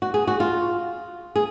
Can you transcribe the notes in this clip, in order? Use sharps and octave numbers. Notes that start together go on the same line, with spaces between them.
F#4
G#4
F#4
F4
G#4